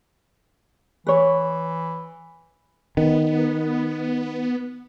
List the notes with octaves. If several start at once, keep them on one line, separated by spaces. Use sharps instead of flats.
E3 B4 C#5
D#3 B3